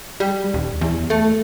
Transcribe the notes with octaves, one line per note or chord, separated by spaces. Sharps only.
G3
D#1
E2
A3